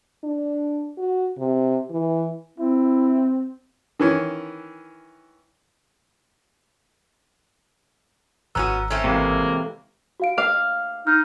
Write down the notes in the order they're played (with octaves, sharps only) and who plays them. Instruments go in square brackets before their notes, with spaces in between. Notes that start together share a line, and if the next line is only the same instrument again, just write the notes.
[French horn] D4
F#4
C3
E3
[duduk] C4 [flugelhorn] E4
[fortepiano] D#3 E3 C#4
[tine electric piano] G#1 A#5 E6 [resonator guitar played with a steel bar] B3 C#4 F#4
[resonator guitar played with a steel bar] A3 C4 C#4
[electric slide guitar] C3 E3 G#3 [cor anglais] A#3
[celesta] F#4 F5 D7
[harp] F5 [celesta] D6
[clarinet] D#4 [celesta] F6